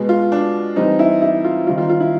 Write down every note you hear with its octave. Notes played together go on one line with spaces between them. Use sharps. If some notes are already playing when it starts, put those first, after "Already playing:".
Already playing: B2 G#3 B3
F4
D4
E3 G3 C4 D#4
E4
E4
F4
D#3 G3 C4 F4
F4
F4
E4